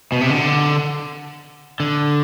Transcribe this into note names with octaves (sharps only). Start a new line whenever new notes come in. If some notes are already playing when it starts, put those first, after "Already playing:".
B2
C3
D3
D3